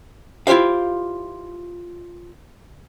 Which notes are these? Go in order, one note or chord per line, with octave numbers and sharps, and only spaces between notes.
E4 F4 G4 C5 F5